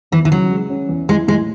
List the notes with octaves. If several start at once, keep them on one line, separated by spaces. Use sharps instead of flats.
E2 E3
E3
C#3 F#3
G#3
C#4
E2
G#3 E4
A2 G#3